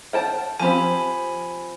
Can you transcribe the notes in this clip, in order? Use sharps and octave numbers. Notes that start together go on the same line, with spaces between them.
F#5 G5 A5
F3 C4 G4 G#5 B5